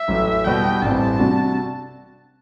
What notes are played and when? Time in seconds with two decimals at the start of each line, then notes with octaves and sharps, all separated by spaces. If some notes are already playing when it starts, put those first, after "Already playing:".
Already playing: E5
0.08 A1 A2 F#3
0.45 E2 B2 G3 B3 F#4 G5
0.82 A1 G2 E3 G3 C4 A5
1.19 C3 G3 D4 F#4